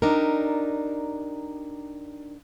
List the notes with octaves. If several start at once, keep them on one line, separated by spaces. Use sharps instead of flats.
D4 D#4 G4 A#4